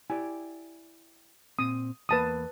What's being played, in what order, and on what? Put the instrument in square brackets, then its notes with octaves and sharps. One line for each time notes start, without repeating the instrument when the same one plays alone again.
[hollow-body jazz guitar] E4 G4 D5 [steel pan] G#5
[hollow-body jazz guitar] A#2 C4 [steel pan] D#6
[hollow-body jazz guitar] E2 A#3 [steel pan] B4 A5 D#6